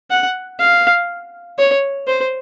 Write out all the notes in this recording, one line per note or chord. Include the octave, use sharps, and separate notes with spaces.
F#5
F5
C#5
C5